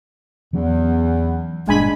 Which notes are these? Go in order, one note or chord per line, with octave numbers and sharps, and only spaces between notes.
E2 E3 F#3 C#4
G1 G2 A#2 G#3 D4 G#5 B5